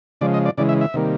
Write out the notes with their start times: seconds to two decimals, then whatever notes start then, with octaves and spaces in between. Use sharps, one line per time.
0.21 C#3 F3 G#3 D5
0.34 D#5
0.46 D5
0.57 C#3 E3 G#3 D5
0.69 E5
0.81 E5
0.94 C3 D#3 G3 A#3